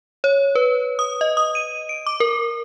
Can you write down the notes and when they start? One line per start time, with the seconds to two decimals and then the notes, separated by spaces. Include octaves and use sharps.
0.24 C#5
0.55 B4
0.99 D#6
1.21 D#5
1.37 D#6
1.55 D#7
1.89 D7
2.06 D6
2.20 A#4